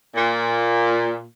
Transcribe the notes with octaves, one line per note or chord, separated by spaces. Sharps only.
A#2